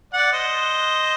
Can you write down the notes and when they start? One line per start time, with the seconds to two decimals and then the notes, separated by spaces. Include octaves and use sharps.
0.13 D5 F#5
0.33 C5 D#5